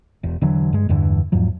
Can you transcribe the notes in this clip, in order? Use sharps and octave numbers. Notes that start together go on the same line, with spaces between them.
E1
E1 D3 E3 F#3
G2 G#3
E2 G2 D3 E3
E2 G#2 F3 F#3